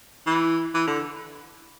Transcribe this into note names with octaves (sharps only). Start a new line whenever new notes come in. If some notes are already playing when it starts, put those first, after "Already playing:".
E3
E3
D3